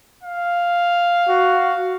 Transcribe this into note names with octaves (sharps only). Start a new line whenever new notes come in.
F5
F#4